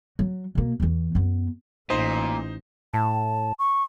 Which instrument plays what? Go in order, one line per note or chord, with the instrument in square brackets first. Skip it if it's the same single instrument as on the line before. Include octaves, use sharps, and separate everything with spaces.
[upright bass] F#3
B2 A#3
E2 E3
F#2 B3
[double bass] A1 [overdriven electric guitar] A#2 [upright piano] D#4 C5
[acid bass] A2 [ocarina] A5
[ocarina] C#6